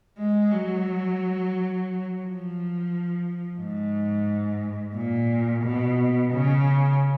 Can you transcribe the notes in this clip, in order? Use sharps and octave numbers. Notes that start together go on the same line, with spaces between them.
G#3
F#3
F3
G#2
A#2
B2
C#3